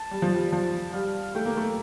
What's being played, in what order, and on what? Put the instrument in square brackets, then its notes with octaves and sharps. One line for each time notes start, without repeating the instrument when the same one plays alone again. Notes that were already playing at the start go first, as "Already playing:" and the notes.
Already playing: [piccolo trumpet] A5
[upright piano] G3
F3
G3
[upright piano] F3 [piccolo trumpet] A5
[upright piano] G3 [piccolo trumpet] F5
[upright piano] A3 [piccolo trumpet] G5
[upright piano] A#3
A3